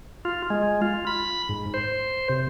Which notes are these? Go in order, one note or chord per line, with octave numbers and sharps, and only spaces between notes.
F4
G#3
F4
B5
G#2
C5
C3